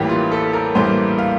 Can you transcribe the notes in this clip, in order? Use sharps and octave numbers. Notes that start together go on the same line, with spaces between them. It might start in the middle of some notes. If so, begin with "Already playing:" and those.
Already playing: A1 G2 E3 G3 A#3 G4
F4
A4
A#4
A1 G2 E3 G3 A#3 C5
F5